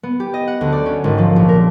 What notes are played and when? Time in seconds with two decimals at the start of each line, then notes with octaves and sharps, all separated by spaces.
0.03 B3
0.20 G4
0.34 D#5
0.48 F#5
0.61 D2
0.72 D5
0.86 C#4
1.04 G#1
1.18 F3
1.36 A#1
1.49 A#4